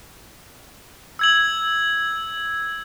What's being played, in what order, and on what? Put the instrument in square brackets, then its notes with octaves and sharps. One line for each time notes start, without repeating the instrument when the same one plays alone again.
[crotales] E6 G#6 F#7